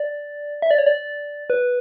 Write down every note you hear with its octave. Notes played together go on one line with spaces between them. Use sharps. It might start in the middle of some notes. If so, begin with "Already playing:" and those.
Already playing: D5
E5
D5
C#5
D5
B4